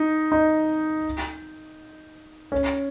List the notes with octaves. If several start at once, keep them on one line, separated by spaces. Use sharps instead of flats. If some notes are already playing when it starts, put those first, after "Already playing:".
Already playing: D#4
D#4
C#4